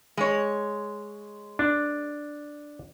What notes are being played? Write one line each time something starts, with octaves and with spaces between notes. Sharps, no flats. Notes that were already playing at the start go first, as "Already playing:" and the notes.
G#3 C#5
D4